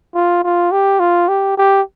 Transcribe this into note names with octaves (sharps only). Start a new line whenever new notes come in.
F4
F4
G4
F4
G4
G4